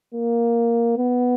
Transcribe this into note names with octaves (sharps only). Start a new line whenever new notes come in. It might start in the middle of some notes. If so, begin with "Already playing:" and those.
A#3
B3